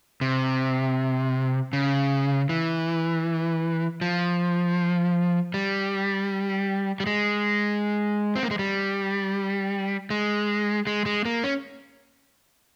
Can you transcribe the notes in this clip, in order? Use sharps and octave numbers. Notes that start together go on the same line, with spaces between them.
C3
C#3
E3
F3
G3
G3
G#3
C4
A#3
G#3
G3
G#3
G#3
G#3
A#3
C#4